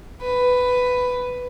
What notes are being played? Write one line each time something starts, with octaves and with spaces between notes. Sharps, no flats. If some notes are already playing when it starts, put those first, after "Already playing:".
B4